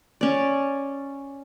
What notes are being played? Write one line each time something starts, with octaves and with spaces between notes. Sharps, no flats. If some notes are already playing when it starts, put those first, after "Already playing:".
C#4 D5